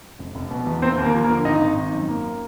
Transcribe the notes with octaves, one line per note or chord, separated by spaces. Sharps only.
F1
F1
B2
E2
A#3 C4 C5
D#2
A#3 A#4
F3
A#3 A#4
D3
G#1 D#4 D#5
G#1
D#3
F#2
A#3